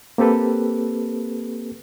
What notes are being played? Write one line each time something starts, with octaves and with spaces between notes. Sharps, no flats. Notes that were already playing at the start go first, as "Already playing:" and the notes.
A#3 C4 G4 A4 B4